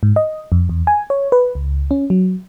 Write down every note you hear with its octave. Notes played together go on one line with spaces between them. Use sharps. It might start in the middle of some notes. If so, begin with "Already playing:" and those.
G#2
D#5
F2
E2
G#5
C#5
B4
C#2
C#4
F#3